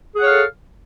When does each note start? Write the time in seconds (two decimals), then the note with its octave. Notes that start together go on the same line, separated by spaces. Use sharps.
0.15 G#4
0.19 F#5
0.23 C#5
0.26 F5
0.30 A4